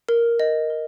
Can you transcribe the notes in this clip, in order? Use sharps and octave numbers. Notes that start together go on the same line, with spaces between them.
A#4
D#5
A#4